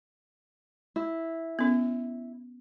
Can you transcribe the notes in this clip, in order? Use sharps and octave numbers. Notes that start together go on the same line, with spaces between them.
E4
B3 C#4